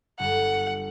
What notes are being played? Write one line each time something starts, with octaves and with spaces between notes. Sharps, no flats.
G1 G2 F#5